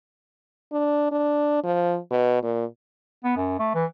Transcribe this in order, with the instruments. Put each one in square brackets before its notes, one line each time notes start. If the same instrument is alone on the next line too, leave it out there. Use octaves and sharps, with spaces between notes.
[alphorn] D4
D4
F3
B2
A#2
[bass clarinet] B3
F#2
A3
E3